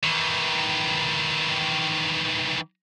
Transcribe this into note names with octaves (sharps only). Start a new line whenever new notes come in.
D#3 E3